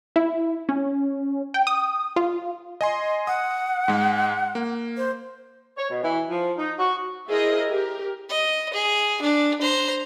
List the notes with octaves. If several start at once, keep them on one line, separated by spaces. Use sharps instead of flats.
E4
C#4
G5
D#6
F4
D#5 G#5 C6
F#5 D#6
G#2 G#3
A#3
C5
C#5
B2
E3
F3
D#4
F#4
E4 G#4 A#4 C5 D#5
G4 A#4
D#5
G#4
D4
C5 A#5